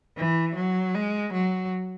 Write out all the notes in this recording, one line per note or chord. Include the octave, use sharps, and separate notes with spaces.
E3
F#3
G#3
F#3